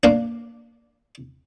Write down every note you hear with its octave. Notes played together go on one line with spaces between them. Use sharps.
A#3 D4